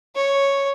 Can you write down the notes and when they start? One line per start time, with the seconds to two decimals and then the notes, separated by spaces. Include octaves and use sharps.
0.15 C#5